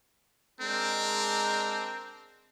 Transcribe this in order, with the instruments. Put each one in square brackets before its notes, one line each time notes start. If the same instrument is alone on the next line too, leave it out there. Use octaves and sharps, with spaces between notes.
[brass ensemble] G#3 D4 A#4 [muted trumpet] C4